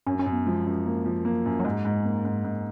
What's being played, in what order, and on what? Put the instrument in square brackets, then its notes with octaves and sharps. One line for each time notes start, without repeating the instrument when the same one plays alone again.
[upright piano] F#2 [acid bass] C#4
[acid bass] C#4
[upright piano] F#2
[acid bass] B3
[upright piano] F3 [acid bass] G#3
[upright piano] F#2
A#3
F3
[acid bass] F#3 [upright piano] A#3
[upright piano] F#2
[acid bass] F#3
[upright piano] G#2 [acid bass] G#3
[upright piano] G#2
A#3
G#2
G#2